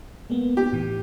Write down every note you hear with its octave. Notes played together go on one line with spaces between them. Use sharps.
G#3 A#3 B3
G4
A2 E3